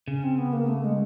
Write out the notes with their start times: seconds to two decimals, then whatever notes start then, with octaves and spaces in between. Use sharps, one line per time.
0.08 C#3 C#4
0.24 C4
0.38 B3
0.53 A#3
0.68 A3
0.84 G#3